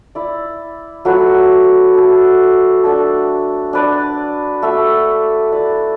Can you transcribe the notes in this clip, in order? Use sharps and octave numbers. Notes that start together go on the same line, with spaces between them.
E4 D5
F#3 A3 F#4 B4
A3 F#4 A4
A3 D4 F#4 A4
D4 B4 D5
A3 F#4 A4 E5
E4 B4 D5